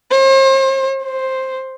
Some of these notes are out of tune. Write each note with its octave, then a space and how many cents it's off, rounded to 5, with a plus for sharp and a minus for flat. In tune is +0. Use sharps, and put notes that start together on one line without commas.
C5 +40
C5 +5